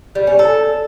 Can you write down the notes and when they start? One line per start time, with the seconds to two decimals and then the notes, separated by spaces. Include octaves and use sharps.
0.15 G3
0.27 C#4
0.39 A4